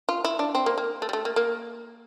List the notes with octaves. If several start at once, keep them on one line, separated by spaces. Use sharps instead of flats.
F4
E4
D4
C4
A#3
A#3
A3
G3
A3
A#3
A#3